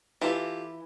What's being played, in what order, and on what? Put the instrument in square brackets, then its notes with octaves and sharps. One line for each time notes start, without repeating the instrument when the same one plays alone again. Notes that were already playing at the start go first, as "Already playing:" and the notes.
[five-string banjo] E3 [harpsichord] F4 G4 A4